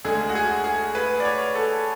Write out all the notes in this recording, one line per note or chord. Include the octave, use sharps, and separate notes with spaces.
D2 D3 G#3 G#4
F#4
G#4
G#4
B4
D5
C#5
A4